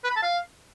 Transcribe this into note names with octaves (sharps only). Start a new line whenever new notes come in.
B4
B5
A5
F5